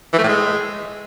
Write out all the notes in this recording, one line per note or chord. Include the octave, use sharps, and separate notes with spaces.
E3
A3
A2
G#3